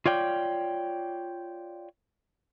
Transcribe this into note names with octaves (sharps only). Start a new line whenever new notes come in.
F4 C#5 D5 G5